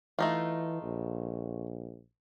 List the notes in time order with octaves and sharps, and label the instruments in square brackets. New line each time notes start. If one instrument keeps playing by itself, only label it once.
[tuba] E3 [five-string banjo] A3 D#4 F4
[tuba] A#1